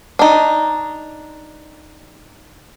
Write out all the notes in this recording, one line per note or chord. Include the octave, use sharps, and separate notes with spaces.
D4 D#4